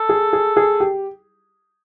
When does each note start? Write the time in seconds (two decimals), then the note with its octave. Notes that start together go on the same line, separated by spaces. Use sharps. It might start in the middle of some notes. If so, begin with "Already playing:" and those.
Already playing: A4
0.09 G#4
0.33 G#4
0.57 G#4
0.80 G4